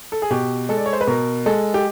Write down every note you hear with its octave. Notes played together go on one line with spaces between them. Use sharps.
A4
G#4
B2 G4
G#3 A4
D5
C#5
C5
B4
B2 A#4
G#3 A4
G4